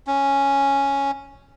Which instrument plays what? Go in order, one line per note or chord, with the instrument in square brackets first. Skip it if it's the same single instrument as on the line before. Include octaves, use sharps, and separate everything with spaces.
[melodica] C#4